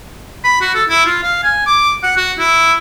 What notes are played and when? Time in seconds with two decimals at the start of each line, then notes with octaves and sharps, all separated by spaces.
0.44 B5
0.61 F#4
0.75 A4
0.89 E4
1.06 F4
1.23 F5
1.44 G#5
1.67 D6
2.03 F#5
2.17 F#4
2.38 E4